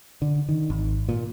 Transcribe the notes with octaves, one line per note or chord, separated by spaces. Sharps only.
D3
D#3
G#1
A#2